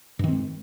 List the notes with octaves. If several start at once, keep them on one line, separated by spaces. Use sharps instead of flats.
G2 D#3 G#3 C4